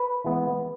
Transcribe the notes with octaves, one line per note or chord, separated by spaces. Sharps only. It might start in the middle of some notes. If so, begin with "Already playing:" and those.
Already playing: B4
E3 G#3 B3